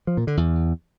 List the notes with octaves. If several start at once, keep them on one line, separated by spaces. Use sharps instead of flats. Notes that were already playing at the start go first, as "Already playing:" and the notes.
F3
A#2
D3
E2